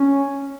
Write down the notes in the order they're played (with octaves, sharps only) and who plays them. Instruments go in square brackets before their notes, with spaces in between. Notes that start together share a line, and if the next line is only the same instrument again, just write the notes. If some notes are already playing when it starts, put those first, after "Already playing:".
Already playing: [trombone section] C#4